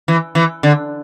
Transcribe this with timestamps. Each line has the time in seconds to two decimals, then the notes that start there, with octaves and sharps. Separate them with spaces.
0.08 E3
0.35 E3
0.63 D3